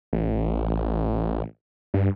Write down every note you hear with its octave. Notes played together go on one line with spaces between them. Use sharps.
A1
G2